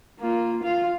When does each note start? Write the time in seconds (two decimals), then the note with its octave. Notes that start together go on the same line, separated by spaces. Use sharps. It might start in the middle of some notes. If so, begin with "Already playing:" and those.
0.20 A#3 F4
0.63 F4 F5